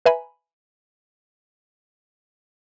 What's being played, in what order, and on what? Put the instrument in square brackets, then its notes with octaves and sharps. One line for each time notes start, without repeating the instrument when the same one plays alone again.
[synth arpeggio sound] B4 E5 G#5 A#5 B5